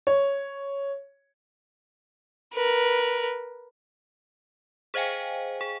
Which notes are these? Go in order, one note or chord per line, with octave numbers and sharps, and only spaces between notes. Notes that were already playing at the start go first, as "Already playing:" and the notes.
C#5
A#4 B4
G#4 C5 D#5 F5 G5 G#5
G#4